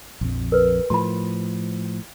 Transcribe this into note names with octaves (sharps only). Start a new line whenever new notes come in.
A#1 F2
A#4 B4
A2 F3 B5 C6